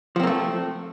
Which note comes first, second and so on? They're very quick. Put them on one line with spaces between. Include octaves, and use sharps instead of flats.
F3 C4 A#3 A3